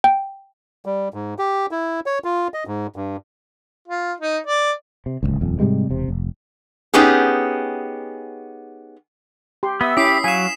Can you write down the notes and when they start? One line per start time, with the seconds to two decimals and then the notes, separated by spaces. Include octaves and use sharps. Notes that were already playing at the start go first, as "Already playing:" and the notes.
0.04 G5
0.86 G3
1.14 G#2
1.39 G4
1.71 E4
2.06 C#5
2.24 F4
2.54 D#5
2.67 G#2
2.96 G2
3.88 F4
4.20 D#4
4.46 D5
5.06 C3
5.23 D1 G1 C#2
5.41 D#1 F2
5.60 G#2 C3 G3 G#3
5.90 E1 C3
6.08 F1
6.94 B3 C#4 D#4 G4 G#4
9.63 G4 C6
9.81 B3 E5 D#6 E6
9.97 C#4 E4 G4 D6 D#6 B6 C7
10.24 F#3 F5 G#5 B6 E7